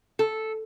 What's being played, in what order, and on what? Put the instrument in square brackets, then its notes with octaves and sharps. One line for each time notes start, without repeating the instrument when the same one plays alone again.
[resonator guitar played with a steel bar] A4